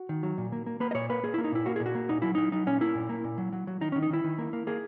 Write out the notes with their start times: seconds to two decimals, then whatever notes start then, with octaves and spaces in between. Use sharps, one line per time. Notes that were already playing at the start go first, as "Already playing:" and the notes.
Already playing: F#4
0.09 D#3
0.23 F#3
0.38 A#2
0.52 A#3
0.66 A#3
0.80 A#3 B4
0.91 D#5
0.95 A#2 C#5
1.09 A#3 B4
1.23 A#3 G#4
1.34 A#3 E4
1.44 D#4
1.52 A#2 E4
1.66 A#3 F#4
1.76 A#2 G#4
1.86 F#4
1.95 A#3
2.09 A#2 D#4
2.22 F#3 E4
2.35 F#3 D#4
2.52 F#3 D#4
2.67 A#2 C#4
2.81 A#3 E4
2.95 A#2
3.09 A#3
3.24 A#2
3.38 F#3
3.53 F#3
3.67 F#3
3.81 D#3 D#4
3.92 D#3 C#4
4.03 D#4
4.10 D#3 E4
4.24 D#3
4.38 A#3
4.53 A#3
4.67 A#3 G#4